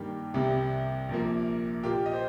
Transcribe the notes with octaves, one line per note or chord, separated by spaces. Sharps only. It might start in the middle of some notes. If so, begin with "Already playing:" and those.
Already playing: G2 D#3 G3 A#3 G4
C2 C3 G3 G4
A#1 A#2 F3 A#3
A#2 A#3 F4 G4
D#5
C5